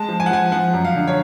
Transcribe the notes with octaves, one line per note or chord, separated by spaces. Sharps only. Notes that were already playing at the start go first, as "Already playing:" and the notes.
Already playing: G#3 A5
F3
G#5
F#5
F3 G#5
F3 F#5
F#2
F5
D3
C#5